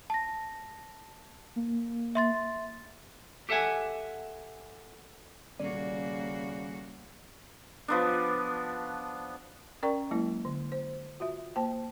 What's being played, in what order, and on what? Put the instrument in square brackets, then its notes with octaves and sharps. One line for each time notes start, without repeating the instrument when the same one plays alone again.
[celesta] A5 A#6
[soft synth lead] A#3
[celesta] E5 C6 A6
[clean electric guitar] G4 A4 E5 F#5 G#5
[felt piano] D#1 [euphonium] C#3 [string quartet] A#3 F#4 [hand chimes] D5
[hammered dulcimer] F3 B3 D4
[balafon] C#4 A#4 D5 G5 A#5 C#6
F#3 G#3 A#3 E4
D3
C5
F4 F#4 E5
A#3 C5 G5 A5